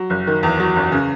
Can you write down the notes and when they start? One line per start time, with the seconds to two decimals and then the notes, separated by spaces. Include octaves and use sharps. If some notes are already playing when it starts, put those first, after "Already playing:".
Already playing: F#3
0.10 F#1
0.27 D#3
0.43 E2
0.60 F#3
0.76 F#1
0.92 C#3